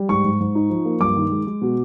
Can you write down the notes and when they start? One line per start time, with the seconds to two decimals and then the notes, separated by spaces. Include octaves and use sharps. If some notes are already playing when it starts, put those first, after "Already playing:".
Already playing: G3
0.09 G#2 C#6
0.25 G#2
0.40 G#2
0.55 D#4
0.70 F3
0.85 A#3
1.01 G2 D6
1.16 D#3
1.32 G#3
1.47 G#3
1.62 B2